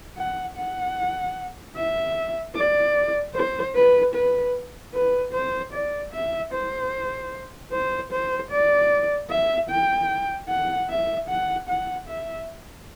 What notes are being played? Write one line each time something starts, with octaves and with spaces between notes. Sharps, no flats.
F#5
F#5
E5
D5
C5
B4
B4
B4
C5
D5
E5
C5
C5
C5
D5
E5
G5
F#5
E5
F#5
F#5
E5